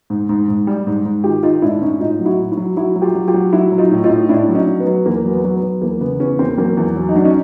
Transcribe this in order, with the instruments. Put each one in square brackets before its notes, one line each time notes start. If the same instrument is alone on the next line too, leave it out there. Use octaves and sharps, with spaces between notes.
[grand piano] G#2
G#2
G#2
G3
G#2
G#2
D#3 F4 G4
D#3 D#4 F4
G#2 D4 E4
G#2 C#4 D#4
A2 D#4 F4
F#3
E4 F#4
A2
E4 F#4
F#3
F#3 E4 F#4
F#3
F4 G4
F#3
F4 G4
F#3
F#3 E4 F#4
F#3
D#4 F4
A2
D#4 F4
A2
A2 D4 E4
F#3
C#4 D#4
F#3
B3
F#3
E2 A#3
F#3
B3
F#3
B3
F#3
E2 A#3
C#3 B3
E2 B3 C#4
E2 A#3 C4
F#3 A#3 C4
E2
F#3
D#4
F#3 D4
C#4 D#4